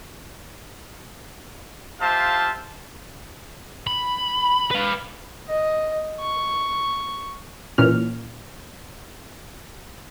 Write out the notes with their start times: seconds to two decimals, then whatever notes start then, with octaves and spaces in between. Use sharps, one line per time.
2.00 F4 G4 C5 E5 F5 A5
3.87 B5
4.71 B4 F5
5.48 D#5
6.20 C#6
7.78 A#2 E3 C#4 F6